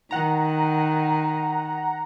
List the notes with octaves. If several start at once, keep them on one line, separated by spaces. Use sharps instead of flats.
D#3 F#5 A#5